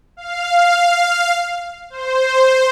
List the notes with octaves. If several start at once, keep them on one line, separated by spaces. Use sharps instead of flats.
F5
C5